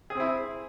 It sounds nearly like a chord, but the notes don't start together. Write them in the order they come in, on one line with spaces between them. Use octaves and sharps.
G#4 C4 E4